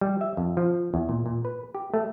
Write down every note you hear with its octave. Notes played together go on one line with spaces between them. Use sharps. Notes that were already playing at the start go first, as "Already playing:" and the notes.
G3
E5
F2
F3
E2
A#2
A#2
B4
G4
A3